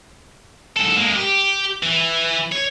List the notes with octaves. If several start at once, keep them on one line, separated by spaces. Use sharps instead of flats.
G#2 A4
G#3 A#3
G4
E3
C#5